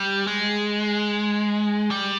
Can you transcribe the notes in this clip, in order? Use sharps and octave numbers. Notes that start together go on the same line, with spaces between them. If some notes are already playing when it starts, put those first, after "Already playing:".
Already playing: G3
G#3
G3